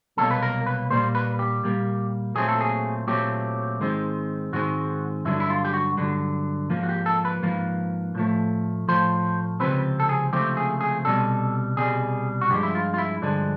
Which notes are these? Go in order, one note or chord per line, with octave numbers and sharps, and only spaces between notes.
C2 B2 F#3 A#3 A4
B4
A#4
B4
A#2 G3 A#3 C5
B4
G4
A#2 G3 A#3
A#2 F#3 A3 C4 G#4
A4
G#4
A#2 F#3 A3 C4 G4
G#2 D#3 G#3 C4
G#2 D#3 G#3 C4 F#4
G2 D3 F#3 E4
E4
F4
G4
F#4
G2 D3 F#3
G#2 F3 A#3
F#4
G4
A4
B4
G#2 F3 A#3
A2 F3 A3
A2 F3 A3 C5
C#2 C3 F3 C4 B4
A4
G#4
C#2 C3 F3 A3 C4 G4
G#4
G#4
C2 B2 G3 A4
C2 B2 G3 G#4
F#4
G2 D3 F3 G#3 G4
E4
F4
F4
E4
G2 D3 F3 G#3 D4